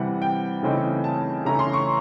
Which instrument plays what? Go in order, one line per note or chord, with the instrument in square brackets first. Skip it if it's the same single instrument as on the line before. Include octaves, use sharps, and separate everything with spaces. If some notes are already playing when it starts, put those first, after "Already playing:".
Already playing: [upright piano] C3 E3 G3 F#5
G5
C#3 E3 A3 C4 D#4
A5
C#3 E3 A3 C#4 E4 A#5
C6
C#6